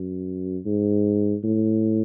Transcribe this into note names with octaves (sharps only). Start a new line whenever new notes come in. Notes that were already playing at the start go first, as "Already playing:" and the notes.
Already playing: F#2
G#2
A2